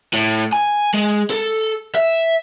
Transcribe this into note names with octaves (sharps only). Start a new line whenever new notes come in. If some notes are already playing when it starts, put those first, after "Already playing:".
A2
G#5
G#3
A4
E5